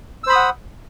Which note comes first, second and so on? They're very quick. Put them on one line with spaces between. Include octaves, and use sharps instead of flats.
E6 C5 B5 D#6 F#5